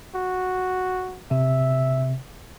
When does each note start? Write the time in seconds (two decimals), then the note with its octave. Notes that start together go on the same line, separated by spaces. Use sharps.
0.15 F#4
1.31 C3 E5